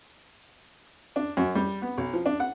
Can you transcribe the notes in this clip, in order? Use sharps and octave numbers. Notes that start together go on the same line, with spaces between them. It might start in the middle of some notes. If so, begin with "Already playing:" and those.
D4
F#2
G3
B3
B1
F3
D4
F#5